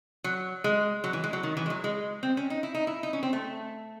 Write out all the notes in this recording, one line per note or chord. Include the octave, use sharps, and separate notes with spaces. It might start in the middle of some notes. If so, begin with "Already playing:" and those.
F#3
G#3
F#3
E3
G#3
F#3
D#3
E3
G#3
F#3
G#3
C4
C#4
D#4
E4
D#4
E4
D#4
C#4
C4
A3